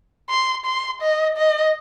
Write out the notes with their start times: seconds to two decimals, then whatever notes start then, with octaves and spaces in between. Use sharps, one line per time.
0.30 C6
0.65 C6
1.02 D#5
1.37 D#5